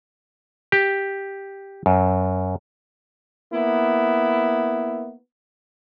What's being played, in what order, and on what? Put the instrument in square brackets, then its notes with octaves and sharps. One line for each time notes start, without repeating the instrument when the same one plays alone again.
[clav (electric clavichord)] G4
F#2
[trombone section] A#3 B3 E4